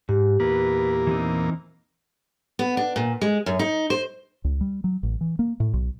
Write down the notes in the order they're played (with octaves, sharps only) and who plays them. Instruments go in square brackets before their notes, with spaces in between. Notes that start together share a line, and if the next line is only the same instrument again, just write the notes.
[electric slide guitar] G#2 [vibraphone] G4
[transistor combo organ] E2 A#2 A#3 [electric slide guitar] B4
[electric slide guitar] E3 C4 D#4
[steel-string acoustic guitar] B3
D4
A#2
G#3
F#2
D#4
C5
[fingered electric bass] C#2
G3
F#3
A1
E3
A#3
A2
B1